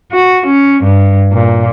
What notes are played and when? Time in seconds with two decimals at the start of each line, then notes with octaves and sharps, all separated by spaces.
0.12 F#4
0.47 C#4
0.84 G2
1.32 A#2